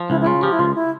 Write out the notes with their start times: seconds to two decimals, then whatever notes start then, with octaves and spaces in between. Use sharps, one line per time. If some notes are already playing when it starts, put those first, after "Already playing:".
Already playing: F3
0.10 C#2 E4
0.20 E4
0.26 C#3 F4
0.42 F3 G4
0.52 E4
0.59 C#2 F4
0.76 E4